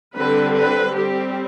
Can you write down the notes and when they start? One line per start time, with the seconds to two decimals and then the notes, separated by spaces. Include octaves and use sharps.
0.17 D3 G3 C4 B4
0.55 B4
0.94 G3 C4 G4